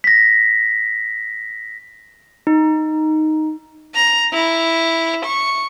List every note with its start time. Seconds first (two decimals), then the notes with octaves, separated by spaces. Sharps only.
0.04 A#6 B6
2.47 D#4
3.95 A#5
4.33 E4
5.25 C#6